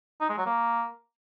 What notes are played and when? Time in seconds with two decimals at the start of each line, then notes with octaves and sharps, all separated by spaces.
0.21 D#4
0.29 G#3
0.38 F#3
0.46 A#3